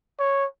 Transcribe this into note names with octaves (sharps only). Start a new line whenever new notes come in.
C#5